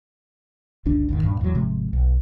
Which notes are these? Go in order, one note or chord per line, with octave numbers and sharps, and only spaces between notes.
F#1 C#2 D3 D4
G#1 E2 D#3
D#1 G2
E2 F#3
G#1 C3 F3 G#3
B1